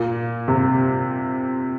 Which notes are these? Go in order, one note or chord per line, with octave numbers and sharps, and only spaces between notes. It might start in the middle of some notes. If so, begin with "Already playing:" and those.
Already playing: A#2
C3